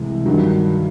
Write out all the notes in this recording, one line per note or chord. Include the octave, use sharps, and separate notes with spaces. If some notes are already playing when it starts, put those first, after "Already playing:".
Already playing: C2 C3 E3 G#3
G2 D#3 F#3